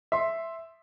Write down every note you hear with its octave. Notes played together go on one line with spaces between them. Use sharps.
E5 C6